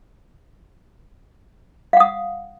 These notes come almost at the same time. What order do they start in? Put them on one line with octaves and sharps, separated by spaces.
F5 F#5 D#6